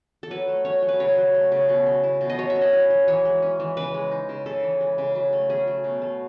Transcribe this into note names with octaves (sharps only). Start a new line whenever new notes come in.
A4
F#3 B4
A3
C#4 C#5
F#3
B4
C#3 C#5
F#3
A3
C#3
B2
A3
E4
B2
D#5
F#3 C#5
E5
C#4
D#5
E4
F#3
E3 C#5
G#3
C#4
E3
C#3 B4
G#3
D#4
C#3
C#3 A4
E3
G#3
C#3
F#3
A3
C#4 G#4
F#3
B2
A3